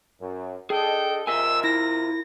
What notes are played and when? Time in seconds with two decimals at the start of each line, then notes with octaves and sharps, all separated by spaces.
0.20 F#2
0.70 D4 G#4 A4 D#5 G5
1.27 C3 F4 A#4 D#5 E5 G#5 E6
1.64 E4 A#6